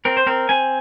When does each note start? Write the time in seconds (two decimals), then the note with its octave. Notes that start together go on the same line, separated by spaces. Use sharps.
0.05 C4 A#4
0.17 C5
0.27 C4 A#4
0.49 C4 G#5